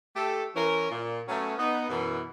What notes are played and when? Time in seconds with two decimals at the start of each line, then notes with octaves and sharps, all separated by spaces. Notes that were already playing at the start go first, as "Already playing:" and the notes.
0.16 A3 G4 A4
0.56 E3 C#4 A#4
0.91 A#2
1.28 F#3 A3 B3 C#4
1.58 B3 D#4
1.89 F#2 B2 E3